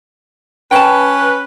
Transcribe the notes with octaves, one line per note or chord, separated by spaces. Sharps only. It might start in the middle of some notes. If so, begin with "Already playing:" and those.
C#4 B4 G5 A5